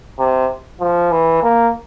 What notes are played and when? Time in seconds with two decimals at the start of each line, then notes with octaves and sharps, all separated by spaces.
0.19 C3
0.80 F3
1.11 E3
1.43 A#3